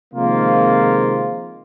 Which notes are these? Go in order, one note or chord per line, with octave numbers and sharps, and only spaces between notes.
C3 D#3 F3 G#3 A#3 F4